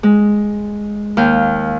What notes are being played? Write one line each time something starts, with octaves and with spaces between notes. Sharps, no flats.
G#3
D#2 F5 G5